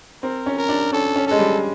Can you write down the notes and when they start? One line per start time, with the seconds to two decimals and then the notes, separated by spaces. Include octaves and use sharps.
0.23 C4 A#4
0.46 C#4
0.58 A#4
0.69 D4
0.93 C#4 A4
1.16 C#4
1.27 G#3 A4
1.39 G3